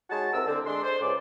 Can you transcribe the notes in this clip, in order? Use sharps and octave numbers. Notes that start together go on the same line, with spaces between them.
G#3 D#4 F#4 C#5 A5
C2 C3 A#4 E6
D3 C4
G#3 D4 C6
C5
C#2 D5